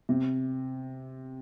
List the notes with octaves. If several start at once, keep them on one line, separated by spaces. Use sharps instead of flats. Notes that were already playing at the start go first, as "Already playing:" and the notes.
C3